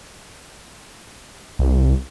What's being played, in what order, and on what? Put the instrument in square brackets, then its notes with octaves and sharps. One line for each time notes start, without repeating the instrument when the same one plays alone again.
[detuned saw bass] C2